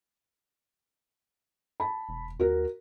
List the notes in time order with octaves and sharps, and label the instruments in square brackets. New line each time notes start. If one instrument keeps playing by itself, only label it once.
[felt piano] A5 B5
[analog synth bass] E1
[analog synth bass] D#2 [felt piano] F#4 A#4